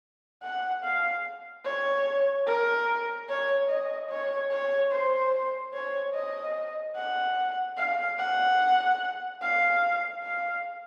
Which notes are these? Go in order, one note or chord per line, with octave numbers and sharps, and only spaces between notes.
F#5
F5
C#5
A#4
C#5
D#5
C#5
C#5
C5
C#5
D#5
F#5
F5
F#5
F5
F5